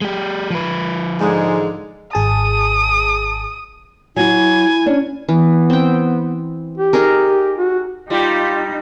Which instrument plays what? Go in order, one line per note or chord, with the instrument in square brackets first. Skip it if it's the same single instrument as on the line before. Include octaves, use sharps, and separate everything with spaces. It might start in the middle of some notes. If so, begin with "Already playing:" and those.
[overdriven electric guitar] G#3 G4
F3 B4
[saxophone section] G#2 D3 G#3
[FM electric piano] G#1 G#4 A5 [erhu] D#6
[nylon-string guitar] F#3 F#4 [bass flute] E4 [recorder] G#5
[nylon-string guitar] C#4 D4
[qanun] E3 [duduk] B3
[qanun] C4 G5
[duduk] G4
[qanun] D#4 G#4 A#4
[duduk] F#4
[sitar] G3 [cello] D#4 [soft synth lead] F4 [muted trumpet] G4